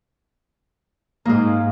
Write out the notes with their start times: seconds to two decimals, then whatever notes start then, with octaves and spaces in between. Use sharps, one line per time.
1.25 G#2 A#3 F4